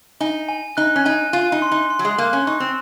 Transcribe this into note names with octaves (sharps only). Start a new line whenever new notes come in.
D#4 G#5
G#5
D#4 F#6
C#4
D#4 G#5
F4 G#5
D#4
C6
D#4
C6
F#3
G#3
A#3 F#6
C#4
D#4 C#6
C4